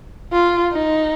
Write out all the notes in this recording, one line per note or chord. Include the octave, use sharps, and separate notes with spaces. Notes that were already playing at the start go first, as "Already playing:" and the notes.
F4
D#4